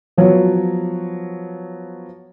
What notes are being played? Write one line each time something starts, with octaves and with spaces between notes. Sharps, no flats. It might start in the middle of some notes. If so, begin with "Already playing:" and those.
F3 F#3 B3 B4 C#5